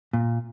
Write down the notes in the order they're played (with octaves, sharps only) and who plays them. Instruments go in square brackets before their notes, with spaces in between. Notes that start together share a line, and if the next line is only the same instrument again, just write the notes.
[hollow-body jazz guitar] A#2